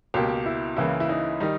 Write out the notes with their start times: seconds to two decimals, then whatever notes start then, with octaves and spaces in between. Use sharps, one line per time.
0.14 C#2 B2 A#3 G4
0.46 E4
0.77 C#2 C#3 E3 A#3 E4
1.00 E4
1.09 D#4
1.40 D#3 G3 D#4